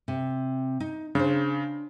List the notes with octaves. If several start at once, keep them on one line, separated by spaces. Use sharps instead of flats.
C3
D#4
C#3 D4 C5